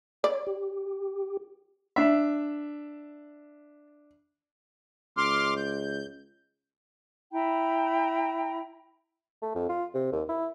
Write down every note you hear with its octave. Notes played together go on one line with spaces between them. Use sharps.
C#5 D5
G4
D4 E5
C#2 C6 D6 F6
G6
E4 G5 A#5 B5
A3
F2
F4
C3
D#2
E4